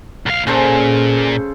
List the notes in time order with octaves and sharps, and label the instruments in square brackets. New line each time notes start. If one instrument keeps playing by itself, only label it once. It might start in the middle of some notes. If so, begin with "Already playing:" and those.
[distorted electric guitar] B1 F5
[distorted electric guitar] A#2 [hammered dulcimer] C#3 A4 C5